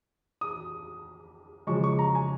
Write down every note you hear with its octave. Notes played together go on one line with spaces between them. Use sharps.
D#6
C#3 F3 G#3 C#6
C#6
A#5
G#5